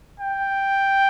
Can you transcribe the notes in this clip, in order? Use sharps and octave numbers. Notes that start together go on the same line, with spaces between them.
G5